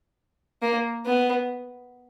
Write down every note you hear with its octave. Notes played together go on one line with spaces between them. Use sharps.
A#3
B3